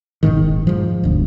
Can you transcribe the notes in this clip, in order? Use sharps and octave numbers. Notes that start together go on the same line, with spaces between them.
E1 A1 G#2 D#3
G#2 F3
E1 D2